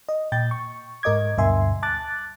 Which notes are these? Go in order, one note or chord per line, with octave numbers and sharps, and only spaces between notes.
D#5
A#2 G5 G6 A6
C#6
G#2 A#4 D#5 D6 G#6
D2 G2 B2 E5 G#5 C6
A5 D6 F#6 A6